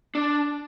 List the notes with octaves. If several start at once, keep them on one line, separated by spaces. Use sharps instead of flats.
D4